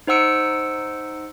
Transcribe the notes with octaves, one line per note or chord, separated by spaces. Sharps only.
D#4 C5 F#5 E6 C#7 D7